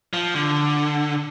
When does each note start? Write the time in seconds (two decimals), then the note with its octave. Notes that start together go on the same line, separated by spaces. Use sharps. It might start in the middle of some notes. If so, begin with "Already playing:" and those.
0.13 F3
0.35 D3